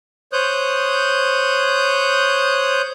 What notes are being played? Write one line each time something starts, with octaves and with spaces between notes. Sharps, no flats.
C5 C#5 D#6 F#6 G6